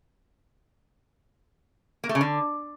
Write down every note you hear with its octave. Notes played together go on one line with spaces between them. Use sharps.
A#3
A3
C#3
D3